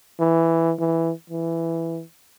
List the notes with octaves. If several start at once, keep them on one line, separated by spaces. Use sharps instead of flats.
E3
E3
E3